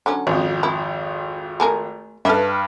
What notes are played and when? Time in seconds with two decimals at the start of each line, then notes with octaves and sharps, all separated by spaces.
0.06 D3 F#3 C#4
0.27 G#1 F2
0.63 E4
1.60 A3 G#4 A#4
2.25 G2 A4 B4 E5 F6